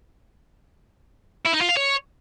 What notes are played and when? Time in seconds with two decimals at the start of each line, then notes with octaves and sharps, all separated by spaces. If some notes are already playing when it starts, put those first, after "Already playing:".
1.45 E4
1.53 D#4
1.61 F4
1.69 F5
1.77 C#5